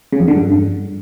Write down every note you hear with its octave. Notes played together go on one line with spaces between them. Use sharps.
C#3
F2
D3
G2